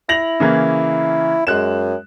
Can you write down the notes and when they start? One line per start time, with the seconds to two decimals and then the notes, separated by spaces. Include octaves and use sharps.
0.09 E4 A#6 F7 F#7
0.40 C#3 E3 A#3
1.47 F#2 G#3 F#6 E7